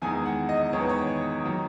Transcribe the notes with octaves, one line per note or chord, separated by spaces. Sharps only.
E2 D#3 G#3 G#5
F#5
D#5
E2 D#3 G#3 C#5
B4
C#5
D#3 F#3 A#3